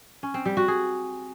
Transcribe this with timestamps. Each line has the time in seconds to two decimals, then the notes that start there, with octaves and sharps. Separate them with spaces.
0.23 C#4
0.34 C4
0.45 G3
0.57 F#4
0.68 G#4